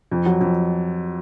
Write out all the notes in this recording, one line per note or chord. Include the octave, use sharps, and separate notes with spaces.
F2
F#3
F2